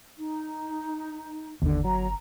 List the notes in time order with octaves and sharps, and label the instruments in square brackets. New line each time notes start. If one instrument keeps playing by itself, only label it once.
[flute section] D#4
[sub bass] G1 [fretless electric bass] D#2 D3
[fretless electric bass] F#3 [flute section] A#5